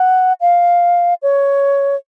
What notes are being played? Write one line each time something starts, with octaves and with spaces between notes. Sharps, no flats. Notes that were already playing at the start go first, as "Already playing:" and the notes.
Already playing: F#5
F5
C#5